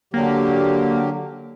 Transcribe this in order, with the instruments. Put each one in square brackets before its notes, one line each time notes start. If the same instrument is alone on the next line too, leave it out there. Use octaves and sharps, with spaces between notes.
[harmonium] D3 F#3 G4 [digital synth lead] A#3